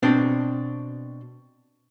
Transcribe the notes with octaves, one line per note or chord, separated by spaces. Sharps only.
B2 C4 D4